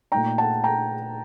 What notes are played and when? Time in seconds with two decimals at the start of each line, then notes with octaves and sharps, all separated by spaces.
0.12 A#2 A3 D#4 G5 A#5
0.38 F#5 A5
0.64 G5 A#5